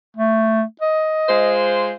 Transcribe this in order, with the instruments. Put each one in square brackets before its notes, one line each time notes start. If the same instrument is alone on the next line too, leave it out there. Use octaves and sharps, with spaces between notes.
[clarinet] A3
D#5
[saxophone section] G#3 F4 C5